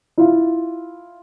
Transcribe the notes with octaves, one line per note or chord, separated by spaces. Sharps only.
E4 F4